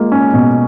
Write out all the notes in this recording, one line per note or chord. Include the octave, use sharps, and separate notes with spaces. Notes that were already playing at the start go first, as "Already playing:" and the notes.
Already playing: G#3 A#3 F4
C#4
B2